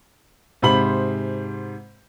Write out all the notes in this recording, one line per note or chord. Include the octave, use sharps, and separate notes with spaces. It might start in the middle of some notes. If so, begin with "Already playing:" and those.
G#2 C3 C5 B5 F#7